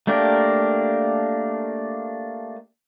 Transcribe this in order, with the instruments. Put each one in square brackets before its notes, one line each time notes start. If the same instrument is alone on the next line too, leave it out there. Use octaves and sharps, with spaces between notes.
[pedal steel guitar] A3 A#3 D4 G4 A#4